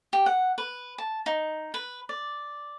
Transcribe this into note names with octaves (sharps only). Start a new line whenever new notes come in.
G4
F#5
B4
A5
D#4
B4
D5